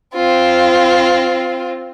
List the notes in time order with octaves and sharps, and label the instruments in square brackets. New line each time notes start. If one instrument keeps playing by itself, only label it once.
[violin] C4 F4